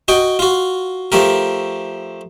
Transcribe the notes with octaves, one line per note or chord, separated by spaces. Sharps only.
F#4 D#5 G5
F4 F#4
F3 A3 G4 A#4